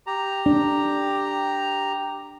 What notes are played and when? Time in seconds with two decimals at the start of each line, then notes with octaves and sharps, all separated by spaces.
0.07 G4 A#5
0.46 D4